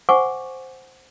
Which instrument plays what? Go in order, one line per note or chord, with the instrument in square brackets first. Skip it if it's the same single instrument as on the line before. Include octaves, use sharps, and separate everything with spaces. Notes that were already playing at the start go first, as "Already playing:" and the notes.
[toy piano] C5 F#5 G#5 C#6 D6